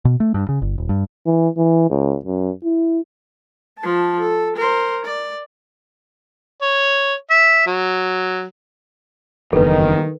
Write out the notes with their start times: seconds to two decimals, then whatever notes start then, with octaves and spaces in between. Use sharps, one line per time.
0.05 B2
0.20 A3
0.34 G2
0.49 C#3
0.62 G1
0.78 D#1
0.89 G2
1.26 E3
1.57 E3
1.90 C#2
2.25 F#2
2.64 E4
3.79 F3 A5
4.20 A4
4.57 A#4 C5
5.05 D5
6.62 C#5
7.30 E5
7.67 F#3
9.53 F#1 E2 G2 D#3 A4 B4